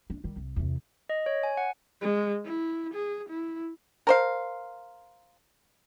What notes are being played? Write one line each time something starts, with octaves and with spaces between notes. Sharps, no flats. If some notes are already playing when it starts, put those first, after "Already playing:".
D4
D#3 G3
C2
E2 C3
D#5
C#5
G#5
F#5
G#3
E4
G#4
E4
A#4 C5 F5